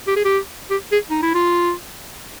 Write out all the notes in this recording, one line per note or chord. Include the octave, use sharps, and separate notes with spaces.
G4
G#4
G4
G4
G#4
D#4
E4
F4